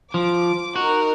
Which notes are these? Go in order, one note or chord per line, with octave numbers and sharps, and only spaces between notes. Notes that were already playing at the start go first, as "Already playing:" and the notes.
F3 D6
D#4 F#4 A#4